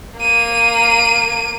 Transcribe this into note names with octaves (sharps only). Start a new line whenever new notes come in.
A#3 D#7